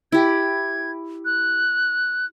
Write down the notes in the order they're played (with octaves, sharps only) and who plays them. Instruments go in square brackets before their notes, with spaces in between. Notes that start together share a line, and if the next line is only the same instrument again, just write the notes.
[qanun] E4 G4 [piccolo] G#6
[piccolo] F#6